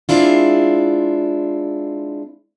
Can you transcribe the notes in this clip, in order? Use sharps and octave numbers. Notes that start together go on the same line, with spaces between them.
G#3 C4 D4 E4 F4